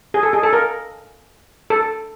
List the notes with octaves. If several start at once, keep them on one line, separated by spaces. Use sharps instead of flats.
G#4
A4
G#4
A4
A#4
A4